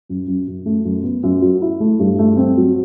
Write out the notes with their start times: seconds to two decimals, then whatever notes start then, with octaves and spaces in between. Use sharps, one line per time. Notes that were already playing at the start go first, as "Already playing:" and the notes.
0.09 F#2
0.28 F#2
0.48 F#2
0.66 A3
0.85 F#2
1.04 B3
1.23 F#2
1.42 F#3
1.62 E4
1.80 A3
1.99 G2
2.19 A3
2.37 C4
2.57 F#3